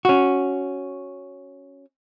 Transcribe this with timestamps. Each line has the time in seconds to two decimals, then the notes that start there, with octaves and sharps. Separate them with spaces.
0.05 C#4 F#4